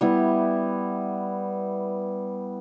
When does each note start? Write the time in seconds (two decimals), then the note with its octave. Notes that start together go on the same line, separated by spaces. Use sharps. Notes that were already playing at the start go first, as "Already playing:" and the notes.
0.01 G3 B3 E4